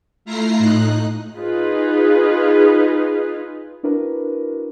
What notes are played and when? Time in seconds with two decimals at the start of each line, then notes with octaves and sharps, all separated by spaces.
0.25 A3 E4 F4 A#5 A#6 C7
0.58 A2 D#4 F#6
1.36 D#4 F4 G#4 B4
3.83 D4 E4 F#4 A#4 B4